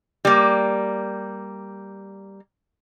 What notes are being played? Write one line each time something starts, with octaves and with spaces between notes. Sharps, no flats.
G3 A#3